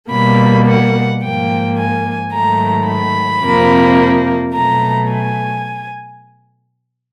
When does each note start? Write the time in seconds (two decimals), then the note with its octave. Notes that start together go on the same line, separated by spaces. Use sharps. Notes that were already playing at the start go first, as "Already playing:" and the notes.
0.11 B2 G3 A#3 B5
0.67 F#5
1.21 G#2 F3 A#3 G5
1.77 G#5
2.32 G#2 D#3 F#3 A3 A#5
2.87 B5
3.43 F2 C3 F3 A#3
4.54 B2 F#3 A3 A#5
5.10 G#5